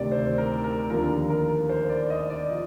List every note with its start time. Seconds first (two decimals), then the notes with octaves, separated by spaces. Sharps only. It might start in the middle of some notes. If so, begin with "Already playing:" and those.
Already playing: D2 C3 D#3 D5
0.12 C5
0.38 A#4
0.64 A#4
0.90 D#2 D3 F3 A#4
1.30 A#4
1.69 C5
1.89 D5
2.10 D#5
2.30 D5
2.50 F3 D#5